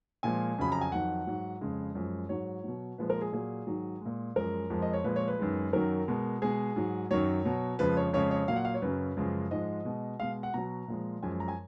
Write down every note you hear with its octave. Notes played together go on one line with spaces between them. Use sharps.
A#2 F3 G#3 G#5
F2 C#3 F#3 B5
A#5
G#5
F2 D#3 F#3 F#5
G#2 F#3
F2 C#3 G#3
F#2 F3 G#3
G#2 F#3 C#5
B2 F#3
A#2 F3 G#3 B4
A#4
G#4
A#2 F#3 G#4
G#2 D#3 F#3
A#2 G#3
F#2 F3 G#3 A#4
F2 F3 G#3
D#5
C#5
A#2 F3 G#3 B4
C#5
B4
F#2 D#3 G#3
F#2 D#3 F#3 A#4
B2 G#3
B2 G#3 G#4
G#2 F#3
F#2 D#3 F#3 C#5
B2 F#3
F2 C#3 F3 G#3 B4
C#5
F2 C#3 G#3 C#5
C#5
A#2 F#3 F5
F#5
F5
C#5
F#2 C#3 F#3 B4
F#2 C#3 F3 G#3
G#2 F3 G#3 D#5
B2 G#3
B2 G#3 F5
F#5
B2 F#3 A#5
A#2 F3 G#3
F#2 F3 G#3 G#5
A#5
G#5